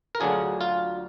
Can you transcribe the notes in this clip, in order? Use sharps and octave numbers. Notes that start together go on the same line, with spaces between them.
A#4
D2 D3 F#3 D4 F4 G#4
F4